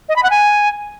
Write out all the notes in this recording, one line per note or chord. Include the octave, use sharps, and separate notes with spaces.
D#5
B5
F#5
G#5